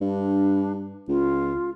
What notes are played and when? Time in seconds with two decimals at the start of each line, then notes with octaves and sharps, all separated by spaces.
0.01 G2 D4
1.09 C#2 F4